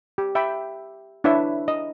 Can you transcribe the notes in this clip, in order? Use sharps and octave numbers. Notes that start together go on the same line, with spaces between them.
G4
E5 G5 B5 D6 E6
D4 E4 B4 C#5 E5
D#5